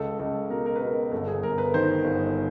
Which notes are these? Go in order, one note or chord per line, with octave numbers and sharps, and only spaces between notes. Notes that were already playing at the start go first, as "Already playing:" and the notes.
Already playing: C#2 A4
C#2 A4
B2 A#4
A#4
B4
B2 A#4
G1 A4
G#4
G1 A#4
B4
D#3 C5
G1